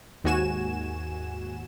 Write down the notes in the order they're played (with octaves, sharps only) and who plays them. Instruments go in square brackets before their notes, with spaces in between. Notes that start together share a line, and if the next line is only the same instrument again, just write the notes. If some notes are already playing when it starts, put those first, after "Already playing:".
[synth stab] D#2 G#2 F#4 G#5 E7